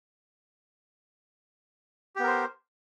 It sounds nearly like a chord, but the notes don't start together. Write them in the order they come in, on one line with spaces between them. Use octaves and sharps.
G4 B3 A#4 C5